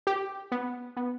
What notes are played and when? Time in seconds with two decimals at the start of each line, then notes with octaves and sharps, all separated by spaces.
0.07 G4
0.52 B3
0.97 B3